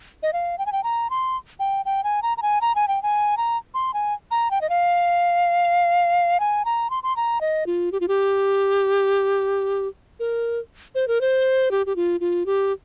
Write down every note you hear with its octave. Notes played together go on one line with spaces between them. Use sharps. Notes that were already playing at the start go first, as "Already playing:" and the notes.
D#5
F5
G5
G#5
G5
A#5
C6
G5
G5
G#5
A#5
A#5
G#5
A#5
G#5
G5
G#5
A#5
C6
G#5
A#5
G5
D#5
F5
G#5
A#5
C6
C6
A#5
D#5
F4
G4
F4
G4
A#4
C5
A#4
C5
G4
G4
F4
F4
G4